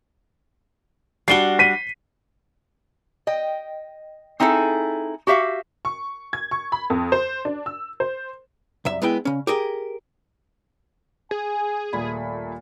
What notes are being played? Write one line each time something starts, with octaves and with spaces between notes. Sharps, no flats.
G3 D4 F#4 C7 G7
B6 D#7
D#5 G5
C4 D#4 E4 G#4 A4
F#4 G4 E5 F5
C#6
G#6
C#6
B5
F2
C5
D4
E6
C5
C2 F#2 E5
G#3 B3 E4 G5
C#3 C#4
G4 G#4 A#4 G5
G#4 G#5
D#1 A#2 A3 B5